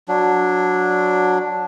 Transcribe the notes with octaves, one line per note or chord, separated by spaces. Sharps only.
F#3 D4